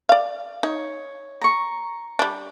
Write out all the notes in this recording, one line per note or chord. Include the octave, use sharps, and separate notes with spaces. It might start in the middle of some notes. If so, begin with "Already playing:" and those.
D5 F5
D#4 C#5
A#5 C#6
G3 D4